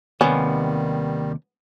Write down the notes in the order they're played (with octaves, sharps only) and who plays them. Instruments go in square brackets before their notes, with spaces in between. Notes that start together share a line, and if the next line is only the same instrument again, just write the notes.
[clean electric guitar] D#2 C3 [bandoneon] D#3 G3 [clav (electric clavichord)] B3 [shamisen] C#4